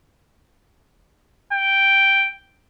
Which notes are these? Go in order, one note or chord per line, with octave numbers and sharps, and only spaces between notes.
G5